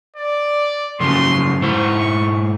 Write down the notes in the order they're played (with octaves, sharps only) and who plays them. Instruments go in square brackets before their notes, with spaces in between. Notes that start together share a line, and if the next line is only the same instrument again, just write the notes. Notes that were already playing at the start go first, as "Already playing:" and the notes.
[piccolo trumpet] D5
[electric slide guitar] F#2 C#3 F3 [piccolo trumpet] C6
[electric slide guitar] G#2 E4 C5 [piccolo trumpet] C#6